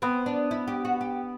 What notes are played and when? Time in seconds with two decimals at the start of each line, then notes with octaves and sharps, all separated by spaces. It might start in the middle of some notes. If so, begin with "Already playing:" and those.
0.02 B3 C4
0.26 D4
0.51 E4
0.68 G4
0.85 F#4
1.01 G4